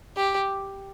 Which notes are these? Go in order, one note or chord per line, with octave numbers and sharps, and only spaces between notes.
G4